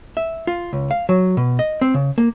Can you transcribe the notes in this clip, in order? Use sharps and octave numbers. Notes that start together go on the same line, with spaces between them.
E5
F4
C#2
F5
F#3
B2
D#5
C4
C#3
A#3